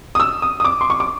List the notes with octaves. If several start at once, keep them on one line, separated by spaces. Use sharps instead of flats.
D#6
E6
D#6
D#6
D6
C6
C#6
D6